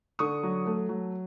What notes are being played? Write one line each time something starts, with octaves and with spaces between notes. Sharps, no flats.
D3 C#6 D#6
F#3
A3
F#3